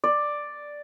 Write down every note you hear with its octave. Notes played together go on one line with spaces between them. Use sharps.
D5